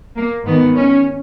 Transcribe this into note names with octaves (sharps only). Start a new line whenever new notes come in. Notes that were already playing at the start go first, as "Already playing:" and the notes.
A#3
G#2 D#3 B3
C#4